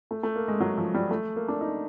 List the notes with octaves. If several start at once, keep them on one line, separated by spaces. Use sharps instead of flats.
A3
A3
A#3
G#3
F#3
F3
G3
A3
A#3
D4
D#4